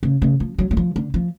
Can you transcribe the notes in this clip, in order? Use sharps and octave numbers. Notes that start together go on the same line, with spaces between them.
C#3
C#3
F3
F#3
F#3
F3
D3
F3